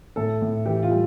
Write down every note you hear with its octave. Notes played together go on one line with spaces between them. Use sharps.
A2 A4
A2
E3 G4
F4
G3